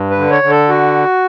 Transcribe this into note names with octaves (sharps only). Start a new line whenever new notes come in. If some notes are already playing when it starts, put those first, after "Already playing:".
Already playing: G2
B4
D3
C#5
D3
A4
F#4